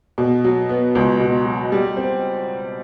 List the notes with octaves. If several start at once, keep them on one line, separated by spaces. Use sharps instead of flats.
B2
F#3
B3
C#2
B2
F#3
G3
C4